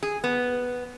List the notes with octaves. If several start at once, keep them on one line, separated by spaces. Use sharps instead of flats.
G#4
B3